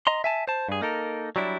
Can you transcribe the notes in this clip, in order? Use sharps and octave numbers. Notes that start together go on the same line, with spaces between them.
D#5 A#5 C6
E5 G#5 A5
C5 A5
G2 G#4
A#3 D#4 A4 A#4
F#3 G3 D4 E4